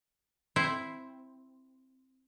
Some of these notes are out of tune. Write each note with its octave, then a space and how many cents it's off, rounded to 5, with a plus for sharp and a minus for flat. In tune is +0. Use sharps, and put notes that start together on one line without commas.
C4 +0 E4 +0 C5 +0